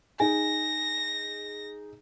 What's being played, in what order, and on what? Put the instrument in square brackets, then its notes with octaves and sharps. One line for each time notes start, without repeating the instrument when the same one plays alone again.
[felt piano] D#4 G#4 [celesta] G#5 [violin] A#6